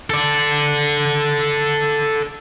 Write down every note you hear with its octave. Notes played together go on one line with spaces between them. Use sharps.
A4 D5